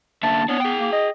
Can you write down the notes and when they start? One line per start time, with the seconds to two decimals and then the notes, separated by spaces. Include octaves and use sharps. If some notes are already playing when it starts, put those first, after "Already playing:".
0.23 D3 A#3 E5 A5
0.49 B3 D4 C#5
0.60 G#4 G5
0.80 A#3
0.92 D#5